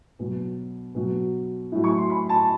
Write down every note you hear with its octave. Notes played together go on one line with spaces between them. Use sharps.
B2 F#3
B2 F#3
A2 F#3
C#6
C6
B5
A5